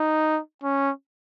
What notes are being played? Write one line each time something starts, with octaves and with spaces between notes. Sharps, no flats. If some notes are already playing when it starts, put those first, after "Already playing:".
Already playing: D#4
C#4